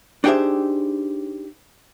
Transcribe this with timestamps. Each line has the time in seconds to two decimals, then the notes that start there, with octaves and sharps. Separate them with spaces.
0.24 D4 D#4 G4 G#4 C5 E5